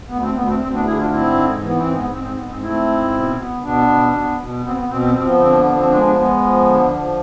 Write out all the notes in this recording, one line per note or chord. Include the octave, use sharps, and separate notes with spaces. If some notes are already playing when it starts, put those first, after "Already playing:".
D2 B3
C4
D2 B3
C4
D2 C4
B3 D4
D3 E4 G#4
D4 F4
G#2 C4 E4
G#2
E3 B3
C4
G#2
B3
G#2 C4
C4
G#2 B3
C4
A3 C4 E4
G#2
B2
B3
B2 B3 D4
B2
B3
B2
B3 C4
B3
B2 C4
C4
F3 C4
B3
D3 C4
B3
F3 B3
C4
G#3 B3 D4
B3 D4
G#3 B3
F3
D3
F3